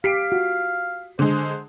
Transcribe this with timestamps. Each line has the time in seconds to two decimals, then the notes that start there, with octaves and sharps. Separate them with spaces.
0.04 G4 F5 B6 C7 D7
0.32 F4 F#4
1.19 D3 G#3 C5